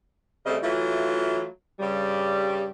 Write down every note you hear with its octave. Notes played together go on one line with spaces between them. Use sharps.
C#3 G3 A3 C4 D#5
E3 F#3 A3 F4
G2 C#3 G3